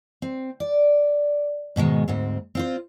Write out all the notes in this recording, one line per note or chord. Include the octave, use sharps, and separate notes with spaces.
C4
D5
G#2 B2 D#3 G#3
D2 G#2 C4
C4 F4 C5